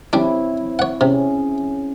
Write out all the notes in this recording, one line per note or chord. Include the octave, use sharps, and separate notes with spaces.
G3 C4 D4 E4 C#5
C#5 F#5
C3 C#4 G#4